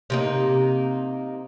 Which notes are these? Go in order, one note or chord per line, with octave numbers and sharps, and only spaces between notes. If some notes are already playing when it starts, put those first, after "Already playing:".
C3 A#3 D#4